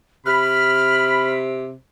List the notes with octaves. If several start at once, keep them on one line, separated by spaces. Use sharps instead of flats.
C3 B5 F6